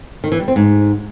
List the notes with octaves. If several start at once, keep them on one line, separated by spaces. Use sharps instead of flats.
D#3
E3
G3
C4
G#2